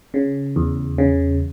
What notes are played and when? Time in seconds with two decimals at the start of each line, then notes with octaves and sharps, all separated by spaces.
0.14 C#3
0.56 E2
0.98 C#3